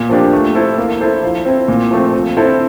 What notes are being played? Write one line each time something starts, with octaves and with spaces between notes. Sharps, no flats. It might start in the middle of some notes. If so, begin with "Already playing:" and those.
Already playing: A#2
F3 A#3 D4 G4
A3
E4 A4 C5
A#3
E4 A4 C5
F3
C4 E4
A#2
F3 A3 C4
F3
C4 E4 A4 C5